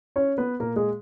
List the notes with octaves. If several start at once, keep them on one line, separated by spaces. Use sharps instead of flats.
C#4 C#5
B3 B4
A#2 A#3 A#4
G#3 G#4